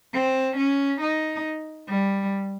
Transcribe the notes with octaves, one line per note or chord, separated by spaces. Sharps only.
C4
C#4
D#4
G3